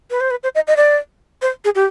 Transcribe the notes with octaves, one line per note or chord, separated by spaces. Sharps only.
B4
C5
B4
C5
D#5
D#5
D5
C5
G#4
G4